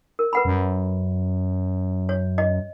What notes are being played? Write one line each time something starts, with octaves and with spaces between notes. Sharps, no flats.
A#4
B4 F#5 B5
F#2
C#5
D#5